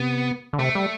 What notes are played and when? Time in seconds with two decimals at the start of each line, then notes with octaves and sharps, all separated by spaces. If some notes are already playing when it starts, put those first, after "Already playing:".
Already playing: C3 B3
0.53 D3
0.59 C3 A3
0.75 G3